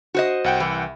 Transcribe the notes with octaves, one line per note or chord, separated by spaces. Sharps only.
F#4 C5 D#5
C2 F#5 G5
E3